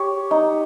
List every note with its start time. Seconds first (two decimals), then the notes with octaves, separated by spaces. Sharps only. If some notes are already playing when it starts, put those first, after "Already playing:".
Already playing: G4 C#5
0.31 D#4